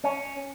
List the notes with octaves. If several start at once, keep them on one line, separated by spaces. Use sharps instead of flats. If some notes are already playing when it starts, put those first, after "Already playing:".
C#4